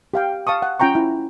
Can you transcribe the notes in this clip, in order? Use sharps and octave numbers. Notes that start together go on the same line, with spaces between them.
G4 F5 G5
F5 A5 C#6 D#6
F#5
C#4 F4 G5 A#5 C#6
E4